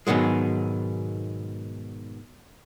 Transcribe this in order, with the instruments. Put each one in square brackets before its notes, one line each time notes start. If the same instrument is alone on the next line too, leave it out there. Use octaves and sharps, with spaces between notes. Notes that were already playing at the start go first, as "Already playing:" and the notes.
[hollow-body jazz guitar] G#2 B2 D#3 F#3 G#3